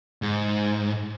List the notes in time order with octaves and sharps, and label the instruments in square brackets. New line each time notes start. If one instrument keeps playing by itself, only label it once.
[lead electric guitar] G#2